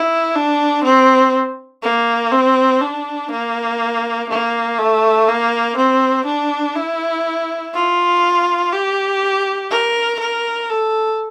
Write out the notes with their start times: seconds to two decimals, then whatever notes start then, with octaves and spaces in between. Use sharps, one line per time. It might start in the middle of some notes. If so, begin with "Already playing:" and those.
Already playing: E4
0.35 D4
0.84 C4
1.83 A#3
2.32 C4
2.81 D4
3.31 A#3
4.30 A#3
4.79 A3
5.28 A#3
5.77 C4
6.26 D4
6.76 E4
7.74 F4
8.73 G4
9.71 A#4
10.20 A#4
10.69 A4